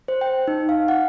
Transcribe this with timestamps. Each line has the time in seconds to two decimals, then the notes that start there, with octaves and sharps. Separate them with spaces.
0.08 C5
0.21 G5
0.48 D#4
0.69 F5
0.88 F#5